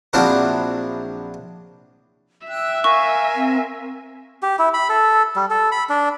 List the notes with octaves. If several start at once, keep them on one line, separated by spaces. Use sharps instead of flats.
A#1 F#3 C4 D4 E4 A#4
E5 G5 E6 F#6
A#4 F5 G#5 C#6
C4
G4
E4
B5
A4
G3
A4
B5
D4